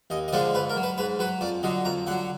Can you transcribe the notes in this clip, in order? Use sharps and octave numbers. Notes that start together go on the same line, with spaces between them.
D#2 D#5
D#5
D3 F3 G#3 D5
G#2 B4
A#4
F#3
B4
G#2 B4
F#3 B4
F2 D5
D3 F#3 D#5
F2 A#5
D3 F#3 F#5